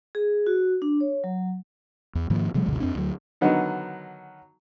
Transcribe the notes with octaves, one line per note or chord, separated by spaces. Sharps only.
G#4
F#4
D4
C#5
F#3
E2
G#2 D#3 F3 A#3
C3 F3 G3 A3
F#1 C#2 B2 D3
F2 C4 D4
D2 F#3
D3 D#3 F#3 B3 D#4